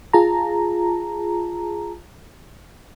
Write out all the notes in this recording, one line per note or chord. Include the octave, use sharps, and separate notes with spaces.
F4 G#4 A5 A#5